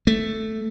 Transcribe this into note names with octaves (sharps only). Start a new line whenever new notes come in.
A3